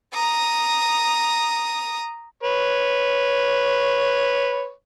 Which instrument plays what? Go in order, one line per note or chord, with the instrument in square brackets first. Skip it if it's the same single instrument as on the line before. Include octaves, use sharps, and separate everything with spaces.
[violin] A#5 D#6
[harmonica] B4 C#5